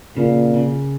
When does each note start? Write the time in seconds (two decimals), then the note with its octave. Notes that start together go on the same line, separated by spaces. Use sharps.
0.17 A#2 C#3
0.54 C#3